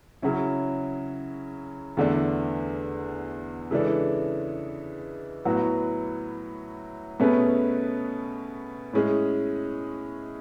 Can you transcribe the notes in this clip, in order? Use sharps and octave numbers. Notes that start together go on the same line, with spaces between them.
C#3 F#3 C#4 E4
E2 D3 A3 D4
C#3 E3 G#3 D4 A4
A2 F#3 B3 F#4
B2 A3 C#4 G#4 B4
A2 G#3 C#4 G#4